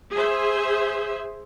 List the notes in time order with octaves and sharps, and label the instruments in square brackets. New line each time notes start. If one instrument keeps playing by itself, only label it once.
[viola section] G#4 C5 E5